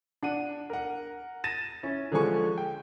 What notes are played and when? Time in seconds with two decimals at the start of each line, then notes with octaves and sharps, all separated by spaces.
0.23 D4 F#5 D#7
0.70 A#4 F#5
1.44 A6 A#6 D#7 E7
1.83 C#4 E4
2.12 D3 F3 G#3 G#5 C#6
2.58 G5